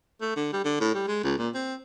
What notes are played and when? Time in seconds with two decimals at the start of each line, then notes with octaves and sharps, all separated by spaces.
0.21 A3
0.36 D3
0.53 G3
0.64 D3
0.80 A2
0.94 G3
1.08 G#3
1.24 C#2
1.38 A#2
1.54 C4